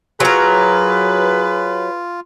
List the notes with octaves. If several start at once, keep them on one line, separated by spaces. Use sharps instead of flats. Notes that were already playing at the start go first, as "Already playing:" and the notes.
F#3 F4 G#4 A#4 B4